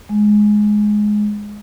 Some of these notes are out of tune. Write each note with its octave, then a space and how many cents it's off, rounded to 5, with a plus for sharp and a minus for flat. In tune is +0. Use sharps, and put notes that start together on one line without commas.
G#3 +10